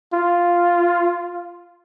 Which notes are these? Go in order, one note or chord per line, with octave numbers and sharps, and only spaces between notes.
F4